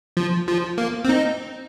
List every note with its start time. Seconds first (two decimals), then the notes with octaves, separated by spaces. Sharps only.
0.17 F3
0.48 F3
0.78 A#3
1.05 C4
1.09 D#4